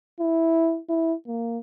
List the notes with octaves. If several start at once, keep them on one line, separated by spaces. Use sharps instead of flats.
E4
E4
A#3